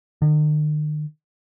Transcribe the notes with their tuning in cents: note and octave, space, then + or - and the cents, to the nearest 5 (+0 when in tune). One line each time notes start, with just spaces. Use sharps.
D#3 -45